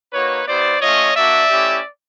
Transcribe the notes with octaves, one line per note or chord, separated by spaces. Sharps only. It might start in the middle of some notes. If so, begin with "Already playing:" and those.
A#3 D#4 F#4 B4 C#5
B3 E4 G4 C5 D5
A3 C#4 F4 C#5 D#5
A#3 D4 F#4 D5 E5
A3 C#4 E4 G4